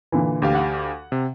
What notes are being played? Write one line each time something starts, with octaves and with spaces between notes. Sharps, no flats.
A#2 D3 E3
D2 G4 F5
F#5
C3